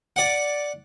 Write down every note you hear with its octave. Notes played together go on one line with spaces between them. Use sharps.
D5 F#5